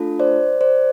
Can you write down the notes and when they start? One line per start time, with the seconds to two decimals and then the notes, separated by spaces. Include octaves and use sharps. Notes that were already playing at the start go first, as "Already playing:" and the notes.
Already playing: A3 D4 F4 A4
0.19 C5 D5
0.61 C5 D5